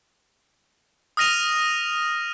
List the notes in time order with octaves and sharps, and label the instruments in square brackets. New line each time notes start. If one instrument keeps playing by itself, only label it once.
[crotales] D#6 F6 A#6 D#7 F7